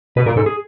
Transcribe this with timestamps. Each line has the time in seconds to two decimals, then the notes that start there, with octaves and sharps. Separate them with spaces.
0.16 B2 B4
0.26 A#2 A#4
0.36 G#2 A4
0.46 G#4